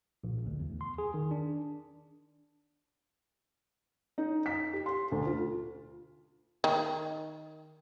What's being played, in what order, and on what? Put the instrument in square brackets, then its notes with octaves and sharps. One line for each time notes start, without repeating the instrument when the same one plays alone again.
[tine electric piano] A#1
D2
E2
C6
G#4
D#3
D4
[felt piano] D#4
B6
G4
C6
D2
F4
[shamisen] D#3